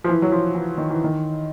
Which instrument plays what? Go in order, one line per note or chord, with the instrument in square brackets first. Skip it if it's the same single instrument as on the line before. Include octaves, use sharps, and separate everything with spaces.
[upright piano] F3
E3
F#3
F3
E3
D#3
E3
D#3